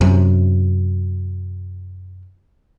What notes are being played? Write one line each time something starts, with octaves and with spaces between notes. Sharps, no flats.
F#2 C3